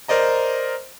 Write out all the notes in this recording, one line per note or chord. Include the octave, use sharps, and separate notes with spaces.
A#4 C5 D5 D#5 A#5